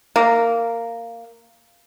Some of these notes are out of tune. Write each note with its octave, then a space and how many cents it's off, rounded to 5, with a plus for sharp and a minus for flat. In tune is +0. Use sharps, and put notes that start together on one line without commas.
A#3 -10